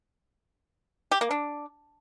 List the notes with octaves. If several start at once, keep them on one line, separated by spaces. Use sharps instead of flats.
G4
A#3
D4